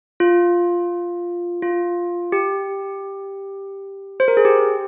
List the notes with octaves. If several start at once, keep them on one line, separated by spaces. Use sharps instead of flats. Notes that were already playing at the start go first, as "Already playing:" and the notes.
F4
F4
G4
C5
A#4
G#4
G4